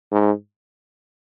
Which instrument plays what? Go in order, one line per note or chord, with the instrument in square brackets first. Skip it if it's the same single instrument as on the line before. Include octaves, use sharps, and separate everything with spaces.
[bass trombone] G#2